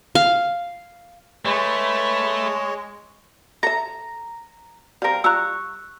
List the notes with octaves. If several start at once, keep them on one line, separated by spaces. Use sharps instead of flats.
F5
G#3 A3 B4 C#5 B5
A4 E5 A#5
G3 C4 A#4 F5
G3 F4 A#5 C#6 E6 F#6